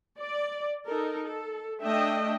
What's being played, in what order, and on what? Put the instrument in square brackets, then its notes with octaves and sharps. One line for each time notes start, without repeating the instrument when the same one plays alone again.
[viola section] D5
D#4 A4 A#4
A4
A3 D4 D#5 E5 G5